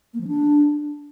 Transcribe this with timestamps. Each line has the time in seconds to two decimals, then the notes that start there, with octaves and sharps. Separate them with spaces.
0.14 A#3
0.21 F3
0.27 D4